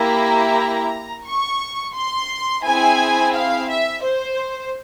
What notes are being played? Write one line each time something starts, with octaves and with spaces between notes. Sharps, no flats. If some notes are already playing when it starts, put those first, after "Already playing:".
Already playing: A#3 E4 G4 A#5
C#6
C6
C4 E4 G#4 G#5
F5
E5
C5